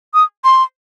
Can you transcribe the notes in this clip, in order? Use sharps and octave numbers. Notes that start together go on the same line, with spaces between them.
D#6
C6